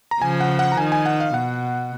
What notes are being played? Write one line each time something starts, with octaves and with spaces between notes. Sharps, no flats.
A#5
C#3 F3 G#5
F#5
F#5
A#5
D#3 G#5
G#5
F#5
F5
B2 F#5